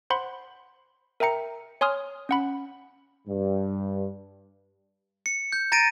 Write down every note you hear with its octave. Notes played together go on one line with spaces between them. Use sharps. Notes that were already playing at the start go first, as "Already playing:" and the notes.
C5 F#5 B5 C6
A#4 E5 G5 A#5 C#7
C#5 G#5 C6 D#6 F6
C#4 F#5 B5
G2
C#7
G6
A#5 A6 A#6 D7 D#7